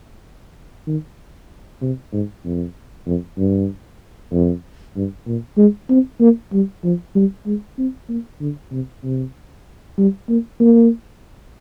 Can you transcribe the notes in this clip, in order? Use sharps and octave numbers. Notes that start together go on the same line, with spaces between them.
D#3
C3
G#2
F2
F2
G2
F2
G2
A#2
G#3
C4
A#3
G3
F3
G3
G#3
C4
A#3
D3
C3
C3
G3
A#3
A#3